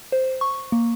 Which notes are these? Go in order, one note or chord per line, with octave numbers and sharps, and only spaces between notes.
C5
C#6
A#3